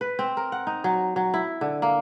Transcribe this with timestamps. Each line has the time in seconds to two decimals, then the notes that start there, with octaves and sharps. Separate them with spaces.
0.01 B4
0.19 C4
0.37 A#4
0.52 F#5
0.67 D#4
0.84 F#3
1.16 F#3
1.34 E4
1.61 D3
1.82 A#3